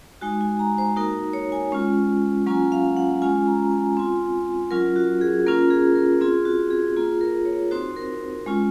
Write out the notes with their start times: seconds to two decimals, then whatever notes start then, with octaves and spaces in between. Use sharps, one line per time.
0.21 G#3 D#4 F#4 G#5
0.41 G#5
0.59 A#5
0.78 C5
0.96 A#3 D#4 F#4 A#4
1.33 C#5
1.52 G#5
1.72 G#3 C#4 F4
2.46 F#3 A#3 C#4 F4 G#5
2.72 F5
2.97 F#5
3.22 G#3 C#4 F4 G#5
3.47 A#5
3.71 G#5
3.97 C4 F4
4.71 F#3 C#4 F4 A#4
4.96 F#4
5.21 G#4
5.47 A#3 C#4 F4 A#4
5.70 G#4
5.95 A#4
6.21 C4 F4 G#4
6.45 F#4
6.70 G#4
6.97 A#3 F4 G#4
7.21 A#4
7.45 C#5
7.71 C4 D#4 F#4 C5
7.96 A#4
8.46 G#3 C#4 F4